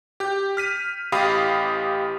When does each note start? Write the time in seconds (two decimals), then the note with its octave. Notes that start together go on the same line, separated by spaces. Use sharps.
0.20 G4 G6
0.57 F6 B6 D#7
1.12 A1 G4 F5 B5 D#6 C7